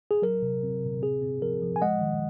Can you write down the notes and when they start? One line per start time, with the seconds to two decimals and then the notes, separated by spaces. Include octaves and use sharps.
0.11 G#4
0.22 F#3 A#4
0.43 C3
0.63 C4
0.83 C3
1.02 C4 G#4
1.22 C4
1.42 F3 A#4
1.62 F3
1.76 G#5
1.82 G#3 D#5 F#5
2.01 D#3